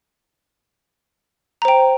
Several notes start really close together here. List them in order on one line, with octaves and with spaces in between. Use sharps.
A#5 C5 G5